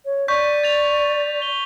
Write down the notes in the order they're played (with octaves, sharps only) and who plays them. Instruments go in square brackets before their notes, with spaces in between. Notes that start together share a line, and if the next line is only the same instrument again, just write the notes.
[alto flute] C#5
[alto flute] D5 [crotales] C#6 G6 B6
[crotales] A6 F7
G7